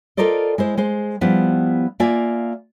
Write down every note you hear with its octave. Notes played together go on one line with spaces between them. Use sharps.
F4 A4 A#4 C5 D5 D#5
G#3 E4 C5
G#3 C5
F3 G3 B3 E4
A#3 F4 D5 E5 G#5